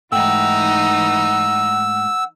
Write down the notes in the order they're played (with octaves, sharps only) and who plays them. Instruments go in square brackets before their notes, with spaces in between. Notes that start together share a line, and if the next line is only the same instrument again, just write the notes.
[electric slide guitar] G#2 A3 G5 [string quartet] E3 D#4 [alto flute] F#5 [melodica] E6